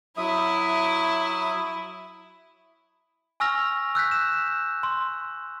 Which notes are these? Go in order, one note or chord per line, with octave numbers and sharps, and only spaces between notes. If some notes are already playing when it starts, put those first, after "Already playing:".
F#3 E4 E5 D#6
G#5 C#6 E6 F6 A#6 F7
E6 F#6 G6 B6
E7
C6